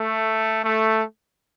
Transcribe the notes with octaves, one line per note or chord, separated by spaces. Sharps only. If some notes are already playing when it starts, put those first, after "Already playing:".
Already playing: A3
A3